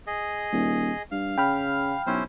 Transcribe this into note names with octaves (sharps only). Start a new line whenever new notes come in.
G#4 D#5
D#1
G2 F5
C#3 G5 B5 F6
B1 C#4 E4 C5